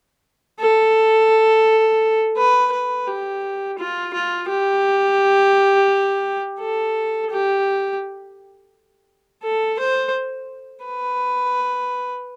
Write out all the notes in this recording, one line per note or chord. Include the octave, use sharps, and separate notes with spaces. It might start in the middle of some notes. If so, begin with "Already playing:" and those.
A4
B4
B4
G4
F4
F4
G4
A4
G4
A4
C5
B4